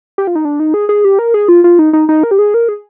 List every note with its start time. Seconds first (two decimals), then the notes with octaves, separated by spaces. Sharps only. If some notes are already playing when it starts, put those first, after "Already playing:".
0.18 G4
0.27 F4
0.35 D#4
0.45 D4
0.60 D#4
0.74 G#4
0.89 G#4
1.05 G4
1.19 A#4
1.34 G#4
1.48 F4
1.64 F4
1.79 D#4
1.93 D#4
2.09 D#4
2.23 A#4
2.31 G4
2.39 G#4
2.54 A#4
2.69 G#4